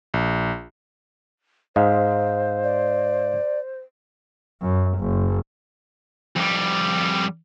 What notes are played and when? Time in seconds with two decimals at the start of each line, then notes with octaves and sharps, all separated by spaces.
0.14 A#1
1.76 G#2 C5 D#5 F5
2.64 D5
4.61 F#2
4.98 F#1
6.36 F2 G3